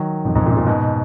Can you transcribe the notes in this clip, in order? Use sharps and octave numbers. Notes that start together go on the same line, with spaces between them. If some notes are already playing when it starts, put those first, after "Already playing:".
Already playing: D#3 F#3
F2 G#2
F2 G#2
F#2 A#2
F#2 A#2
G#2 B2